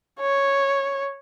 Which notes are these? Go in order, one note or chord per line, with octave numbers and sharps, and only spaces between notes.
C#5